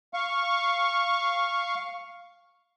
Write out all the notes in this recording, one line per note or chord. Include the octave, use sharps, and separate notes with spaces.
F5 C#6